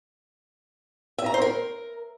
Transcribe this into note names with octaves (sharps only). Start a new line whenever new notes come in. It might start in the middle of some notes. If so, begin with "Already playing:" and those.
E5
A#5
C5
A#4